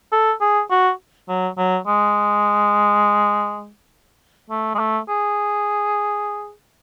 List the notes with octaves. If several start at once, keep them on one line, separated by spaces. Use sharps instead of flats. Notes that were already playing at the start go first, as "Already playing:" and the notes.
A4
G#4
F#4
F#3
F#3
G#3
A3
G#3
A3
G#4